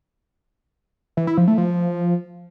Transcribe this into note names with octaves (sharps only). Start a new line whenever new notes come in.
E3
E4
F3
A3
F3